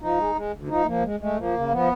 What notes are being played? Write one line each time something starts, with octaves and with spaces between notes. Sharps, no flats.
F3 D#4
G#3
G#3
D2
F3 D#4
A3
F3 A#3
G#3
G#3 A3
F3 A#3
C#3
F3 B3